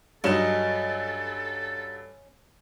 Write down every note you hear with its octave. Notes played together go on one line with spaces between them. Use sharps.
G2 F#3 C#4 A4 D#5 E7